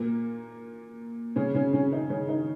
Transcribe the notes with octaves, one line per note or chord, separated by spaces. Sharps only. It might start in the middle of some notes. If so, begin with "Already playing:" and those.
Already playing: A#2 A#3
C#3 C#4
C#3 C#4
C#3 C#4
D#3 D#4
C#3 C#4
D#3 D#4